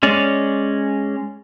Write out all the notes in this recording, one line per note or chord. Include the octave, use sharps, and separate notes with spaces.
G#3 C#4 D5